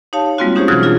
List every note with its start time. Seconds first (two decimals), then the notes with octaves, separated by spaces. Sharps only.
0.13 D#4 G4 C#5 F5 A5
0.38 G3 G#3 A#3 C4 F4 F#4
0.56 C#4 D#4 G4 G#4 C5 C#5
0.68 B2 E3 F#3 F6 F#6 G#6
0.82 D4 F4 G#4